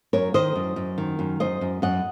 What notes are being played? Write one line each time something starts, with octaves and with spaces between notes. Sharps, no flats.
F#2 A#4 C#5
D#3 C5 D#5
F#2
F#2
D#3
F#2
F#2 C5 D#5
F#2
F#2 D#5 F#5